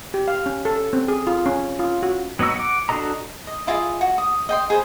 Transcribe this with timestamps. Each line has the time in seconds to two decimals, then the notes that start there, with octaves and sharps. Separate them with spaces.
0.14 G4
0.28 F5
0.46 C#4
0.65 A4
0.93 C4
1.08 G#4
1.27 F4
1.46 C#4
1.79 F4
2.03 F#4
2.39 F#3 B3 D#4 F#4 E6
2.56 F#5 D6
2.89 D4 F#4 A4 D#5 A#5
3.47 D#5
3.67 E4 F4 G#4 D#5
4.01 F#4
4.18 D#6
4.49 D#5 G5 C6
4.70 G#4 B4 C5